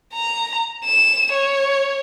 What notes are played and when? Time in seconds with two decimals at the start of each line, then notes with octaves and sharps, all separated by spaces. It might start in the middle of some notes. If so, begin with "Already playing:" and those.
0.13 A#5
0.84 E7
1.32 C#5